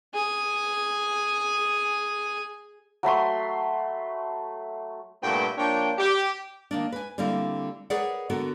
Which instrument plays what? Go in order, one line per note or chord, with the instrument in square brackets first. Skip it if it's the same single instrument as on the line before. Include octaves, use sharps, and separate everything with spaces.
[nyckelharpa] G#4 G#5
[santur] F#3 A3 B5 C6
[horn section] G2 A#2 A3 B3 E4 G5
F3 A#3 D4 C#5 G5
G4
[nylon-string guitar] D#3 A#3 D4
B4 G#5
D3 G3 A#3 C4 E4
G#4 A#4 B4 C#5 D5 F#5
D3 B3 F#4 A4 A#4